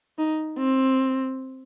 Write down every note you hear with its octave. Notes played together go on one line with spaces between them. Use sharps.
D#4
C4